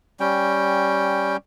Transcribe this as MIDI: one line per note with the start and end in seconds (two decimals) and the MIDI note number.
0.20 1.37 55
0.20 1.37 61
0.20 1.37 79